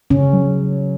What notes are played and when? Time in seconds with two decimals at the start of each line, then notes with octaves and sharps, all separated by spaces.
0.10 C#3 C#4
0.33 F#3